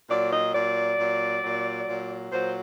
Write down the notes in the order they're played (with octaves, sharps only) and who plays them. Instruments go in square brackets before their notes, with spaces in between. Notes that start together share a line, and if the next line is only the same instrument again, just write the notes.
[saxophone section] A#2 F#3 D5
D#5
A#2 F#3 D5
A#2 F#3
A#2 F#3
A#2 F#3
A#2 F#3 C5